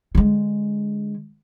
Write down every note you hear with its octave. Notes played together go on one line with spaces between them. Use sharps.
D3 G#3